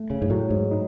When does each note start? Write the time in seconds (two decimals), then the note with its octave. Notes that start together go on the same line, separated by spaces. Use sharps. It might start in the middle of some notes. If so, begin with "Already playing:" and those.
Already playing: A3
0.10 C#3
0.22 G#2
0.30 A2 F#3
0.50 G#2
0.71 D#4